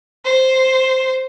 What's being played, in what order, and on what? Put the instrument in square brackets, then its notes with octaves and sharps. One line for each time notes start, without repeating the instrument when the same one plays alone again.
[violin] C5